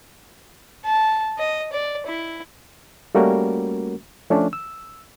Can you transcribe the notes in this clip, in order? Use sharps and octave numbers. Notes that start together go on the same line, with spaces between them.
A5
D#5
D5
E4
G3 A3 A#3 C#4 F#4 A#4
F3 A3 C#4 D4
E6